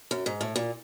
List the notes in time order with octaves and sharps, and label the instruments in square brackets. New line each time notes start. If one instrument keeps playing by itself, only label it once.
[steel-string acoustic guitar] F#2
G#2
A2
A#2